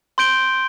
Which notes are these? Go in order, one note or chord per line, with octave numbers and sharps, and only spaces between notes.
C6 G6 D7 G7